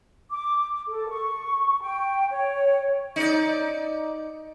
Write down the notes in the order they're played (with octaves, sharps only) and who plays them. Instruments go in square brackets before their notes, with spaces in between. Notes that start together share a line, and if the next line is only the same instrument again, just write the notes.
[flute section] D6
A4
C#6
G5
C#5
[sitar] D#4 D5